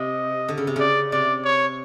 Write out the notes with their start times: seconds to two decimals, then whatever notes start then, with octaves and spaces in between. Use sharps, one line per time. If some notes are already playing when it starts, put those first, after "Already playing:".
Already playing: C3 D#5
0.48 D3
0.58 C#3
0.67 C3
0.76 C#3 D5
1.12 C3 D5
1.44 C#5